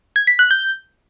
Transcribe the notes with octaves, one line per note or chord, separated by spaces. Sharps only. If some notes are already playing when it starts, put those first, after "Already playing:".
G#6
B6
F#6
G6